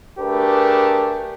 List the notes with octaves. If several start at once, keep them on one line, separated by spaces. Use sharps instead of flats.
A3 D4 G4 G#4 A#4 B4